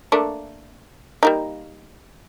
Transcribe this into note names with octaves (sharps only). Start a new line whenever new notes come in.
A3 A#3 D4
G3 A#3 D#4